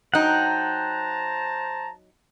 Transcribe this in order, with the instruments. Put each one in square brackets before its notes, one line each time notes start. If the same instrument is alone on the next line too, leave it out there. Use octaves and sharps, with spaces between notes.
[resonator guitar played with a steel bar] F#3 D#4 [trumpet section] C5 A5 A#5 [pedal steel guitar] F#5 G5